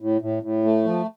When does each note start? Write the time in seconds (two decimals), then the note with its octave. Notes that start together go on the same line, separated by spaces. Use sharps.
0.01 A2
0.21 A2
0.43 A2
0.64 A3
0.85 F3